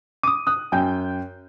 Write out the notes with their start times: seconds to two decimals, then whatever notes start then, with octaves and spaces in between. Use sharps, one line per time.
0.23 D6 D#6 D#7
0.47 D#6 F#6
0.72 F#2 G5 G#5 G6